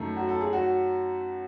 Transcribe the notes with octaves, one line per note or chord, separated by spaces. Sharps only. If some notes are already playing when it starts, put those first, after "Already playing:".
Already playing: F#2 D#3 A3
F#4
A4
G#4
F#4